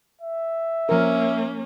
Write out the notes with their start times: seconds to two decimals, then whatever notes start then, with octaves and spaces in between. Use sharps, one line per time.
0.21 E5
0.89 F3 A#3 C#4 A#4